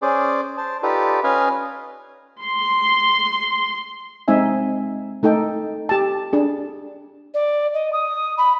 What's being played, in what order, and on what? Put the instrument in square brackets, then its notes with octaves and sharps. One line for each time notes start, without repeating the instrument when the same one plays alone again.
[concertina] C#4 G#4 C5 D5
C5 A5
D#4 F4 G4 A4 B4 D5
C#4 B4 D#5 F5 G#5
[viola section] C6
[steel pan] G#3 C4 D#4 E5 G#5
A3 D#4 A4 G5
G4 A5
D4 G#4
[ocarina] D5
D#5
D#6
B5